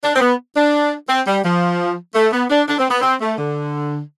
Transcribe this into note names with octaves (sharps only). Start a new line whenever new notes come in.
D4
C4
B3
D4
C4
G3
F3
A3
B3
D4
D4
C4
B3
C4
A3
D3